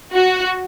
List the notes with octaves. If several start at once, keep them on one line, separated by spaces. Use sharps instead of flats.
F#4